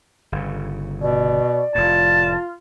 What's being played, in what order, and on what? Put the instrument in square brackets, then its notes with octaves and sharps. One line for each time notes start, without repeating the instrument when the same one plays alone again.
[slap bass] G1 C#3
[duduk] B2 [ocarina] D5
[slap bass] F1 A2 [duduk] F4 [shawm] A5